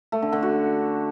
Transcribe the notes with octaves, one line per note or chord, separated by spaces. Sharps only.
A3
D3
D3
F#4